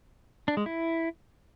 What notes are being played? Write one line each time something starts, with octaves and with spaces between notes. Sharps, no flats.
D4
G#3
E4